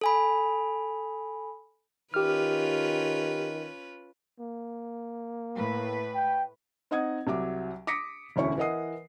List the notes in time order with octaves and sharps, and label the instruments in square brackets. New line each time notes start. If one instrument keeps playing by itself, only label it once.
[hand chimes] A4 G#5 B5
[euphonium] D#3 [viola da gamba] C#4 F4 B4 [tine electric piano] G4 F6
[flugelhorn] A#3
[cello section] A2 B4
[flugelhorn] G5
[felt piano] C4 D#4 D#5 F#5 D#6 G#6
C2 F#3 E5 D6
D6 D#6 A#6 B6 C#7 D7
E1 D2 C#4 E4 C#5 C#6
E3 A#4 D#5 F#5 D#6 C7